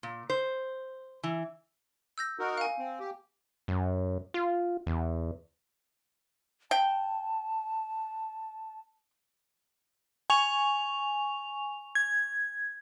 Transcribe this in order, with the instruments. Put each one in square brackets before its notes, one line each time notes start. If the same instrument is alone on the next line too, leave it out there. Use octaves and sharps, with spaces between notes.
[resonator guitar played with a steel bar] A#2
C5
E3
[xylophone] E6 G6 A#6
[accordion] D#4 F#4 A#4
[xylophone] F5 G#5
[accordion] C4
G4
[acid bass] F#2
F4
E2
[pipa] G5 [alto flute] A5
[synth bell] G#5 C#6 F7
G#6